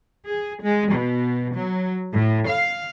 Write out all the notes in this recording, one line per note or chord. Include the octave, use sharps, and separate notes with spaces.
G#4
G#3
B2
F#3
A2
F5